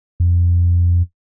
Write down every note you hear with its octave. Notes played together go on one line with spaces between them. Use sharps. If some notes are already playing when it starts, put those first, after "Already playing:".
F2